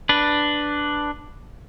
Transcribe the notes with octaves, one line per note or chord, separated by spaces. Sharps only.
D4 B4